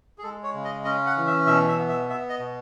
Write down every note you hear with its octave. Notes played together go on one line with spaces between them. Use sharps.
G#4
G#3 A4
C#5
C#3
D#5
C#4 D#5
F#5
E3
E5
B2 E5
E5
B3
E5
B3 E5
D#5
B2